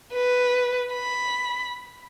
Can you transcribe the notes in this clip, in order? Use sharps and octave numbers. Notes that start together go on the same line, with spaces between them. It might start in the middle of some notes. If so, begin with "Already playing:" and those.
B4
B5